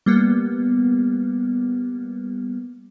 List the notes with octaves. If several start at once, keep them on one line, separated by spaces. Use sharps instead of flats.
G3 A#3 B3